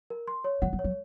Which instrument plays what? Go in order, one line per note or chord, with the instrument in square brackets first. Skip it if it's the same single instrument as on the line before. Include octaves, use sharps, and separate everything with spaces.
[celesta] A#4
C6
C#5
[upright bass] F3 [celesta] F#5
[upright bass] F#3
[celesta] C#5
[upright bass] F#3